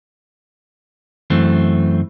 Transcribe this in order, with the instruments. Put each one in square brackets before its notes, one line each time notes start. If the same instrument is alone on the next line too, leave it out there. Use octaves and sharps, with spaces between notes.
[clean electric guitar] F#2 E3 A3 C4